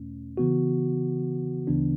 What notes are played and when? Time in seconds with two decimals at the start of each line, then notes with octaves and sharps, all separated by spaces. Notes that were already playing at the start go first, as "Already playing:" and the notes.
Already playing: E2 B2 A3 C#4
0.37 C#3 E3 B3 F#4
1.67 D2 C#3 E3 B3 D4